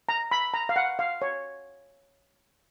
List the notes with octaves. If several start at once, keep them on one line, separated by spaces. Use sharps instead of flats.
A#5
B5
A#5
F5
F#5
F5
C#5